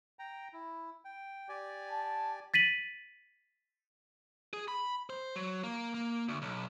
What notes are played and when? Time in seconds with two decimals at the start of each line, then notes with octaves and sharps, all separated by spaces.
0.19 G5 A#5
0.53 E4
1.05 G5
1.49 G4 D5 G#5
1.91 A5
2.54 A6 B6 D#7 F#7
4.53 G#4
4.68 B5
5.10 C5
5.36 F#3
5.64 A#3
5.94 A#3
6.29 D2
6.42 B1